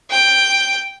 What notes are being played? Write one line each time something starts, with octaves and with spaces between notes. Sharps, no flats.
G5